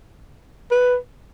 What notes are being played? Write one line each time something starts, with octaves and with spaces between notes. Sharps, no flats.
B4